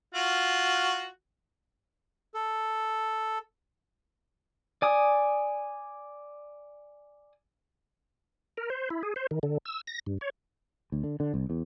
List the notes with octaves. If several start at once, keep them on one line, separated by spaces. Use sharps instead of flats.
F4 F#4
A4
D5 G#5 D#6
A#4
C5
E4
G#4
C5
D#3
D3
E6
A#6
G2
C#5
D2
D3
D3
C2
E2